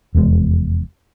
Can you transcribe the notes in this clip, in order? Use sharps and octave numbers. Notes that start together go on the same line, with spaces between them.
F1 E2 A#2 G#3